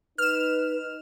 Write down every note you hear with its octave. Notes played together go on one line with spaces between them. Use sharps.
D#4 B4 F6 E7